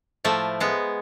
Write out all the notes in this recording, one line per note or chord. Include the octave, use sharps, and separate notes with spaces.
A2 F3 A3
G#3 B3